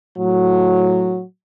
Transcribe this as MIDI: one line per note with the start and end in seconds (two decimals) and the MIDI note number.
0.18 1.21 45
0.18 1.21 54